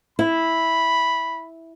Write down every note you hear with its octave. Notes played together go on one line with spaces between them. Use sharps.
E4 B5